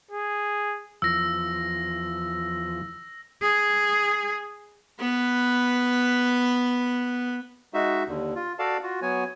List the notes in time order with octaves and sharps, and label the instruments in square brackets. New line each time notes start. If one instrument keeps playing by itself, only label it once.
[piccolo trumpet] G#4
[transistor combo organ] E2 F3 [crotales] E6 A#6
[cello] G#4
[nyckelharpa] B3 B4
[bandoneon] G#3 D#4 F#4 E5
D#2 D3
F4
F#4 A4 D5 F5 A5
F4 F#4
F#3 B3 C#5 G#5